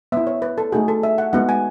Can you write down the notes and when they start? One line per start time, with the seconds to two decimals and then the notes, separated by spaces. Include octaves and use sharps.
0.12 B3 E4 E5
0.27 C#5
0.42 B4
0.58 A4
0.72 A3 D#4 F#4 G#4
0.88 A4
1.03 E5
1.18 F#5
1.33 G#3 B3 D#4 F#4 F#5
1.49 G#5